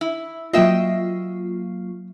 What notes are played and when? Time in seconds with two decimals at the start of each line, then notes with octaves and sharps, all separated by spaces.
0.01 E4
0.53 F#3 A#3 F4 D#5 E5 G5